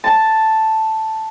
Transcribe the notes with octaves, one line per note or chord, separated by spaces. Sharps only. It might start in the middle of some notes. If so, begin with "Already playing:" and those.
A5